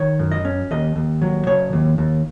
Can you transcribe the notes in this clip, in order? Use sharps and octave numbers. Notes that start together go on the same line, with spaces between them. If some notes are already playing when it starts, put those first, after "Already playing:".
Already playing: D#3 C#5
F#2
D#5
C#4
D#2 D#5
D#2
F#3
C#3 C#5
D#2
D#2